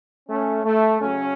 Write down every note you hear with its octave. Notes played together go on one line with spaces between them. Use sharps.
A3 C#4
A3
C#3 F#3 A3 C#4